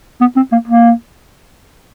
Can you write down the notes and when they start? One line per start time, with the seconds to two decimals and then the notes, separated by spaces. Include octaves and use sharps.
0.21 B3
0.36 C4
0.52 A#3
0.67 A#3